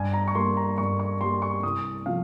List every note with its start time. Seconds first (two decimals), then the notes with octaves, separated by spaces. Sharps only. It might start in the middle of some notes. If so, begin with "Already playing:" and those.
Already playing: G2 G#5
0.14 A#5
0.28 C#6
0.35 G3 A#3 C6
0.57 A#5
0.78 G2 C#6
0.99 C#6
1.21 G3 A#3 C6
1.42 C#6
1.63 C2 D#6
2.06 C3 F3 F5